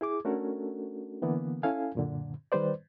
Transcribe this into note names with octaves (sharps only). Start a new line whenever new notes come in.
E4 G#4 D6
A3 C#4 D4 F#4 A4 A#4
D3 E3 A#3 B3
C#4 E4 A4 F5 G#5
F#2 A#2 D3
D#3 G3 B4 C5 D5